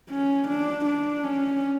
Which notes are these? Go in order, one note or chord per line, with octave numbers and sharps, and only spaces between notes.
C#4
D4
D4
C#4